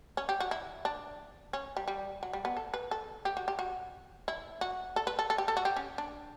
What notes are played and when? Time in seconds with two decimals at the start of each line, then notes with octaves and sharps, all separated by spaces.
0.17 C#4
0.29 G4
0.40 F#4
0.51 E4
0.85 D4
1.53 C#4
1.77 G3
1.88 G3
2.23 F#3
2.33 G3
2.45 B3
2.57 A4
2.74 B4
2.91 A4
3.25 G4
3.37 F#4
3.48 G4
3.59 F#4
4.28 E4
4.61 F#4
4.96 A4
5.07 B4
5.19 A4
5.30 A4
5.38 G4
5.48 A4
5.57 F#4
5.65 G4
5.76 C#4
5.98 D4